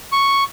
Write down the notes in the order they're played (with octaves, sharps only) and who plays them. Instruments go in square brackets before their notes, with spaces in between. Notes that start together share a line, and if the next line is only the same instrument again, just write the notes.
[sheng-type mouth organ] C#6